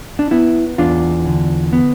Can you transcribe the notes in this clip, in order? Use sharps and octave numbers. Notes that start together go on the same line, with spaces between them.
D4
B3 E4
E2 D4 F4
D3
B3